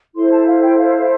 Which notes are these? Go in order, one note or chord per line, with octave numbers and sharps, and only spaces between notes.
E4 A4 C5 C6
A5
F5
G5
F5